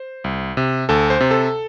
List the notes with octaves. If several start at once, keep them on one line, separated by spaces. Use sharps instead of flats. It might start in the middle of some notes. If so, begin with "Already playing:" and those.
Already playing: C5
C2
C3
D2 A4
C5
C3
A4